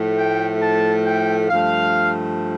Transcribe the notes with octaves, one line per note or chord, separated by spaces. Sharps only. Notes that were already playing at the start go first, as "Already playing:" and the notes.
Already playing: A2 F3 A3
G5
A5
G5
G2 F3 A3 F5